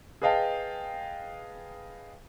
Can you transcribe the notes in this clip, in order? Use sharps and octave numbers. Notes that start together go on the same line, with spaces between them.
G#4 B4 D#5 F5 G5 A5